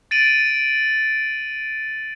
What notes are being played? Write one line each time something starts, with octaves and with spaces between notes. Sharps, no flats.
A6 D7 D#7 F#7